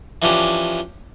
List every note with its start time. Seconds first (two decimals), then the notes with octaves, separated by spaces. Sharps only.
0.22 E3 F3 C#4 D4 G4 C5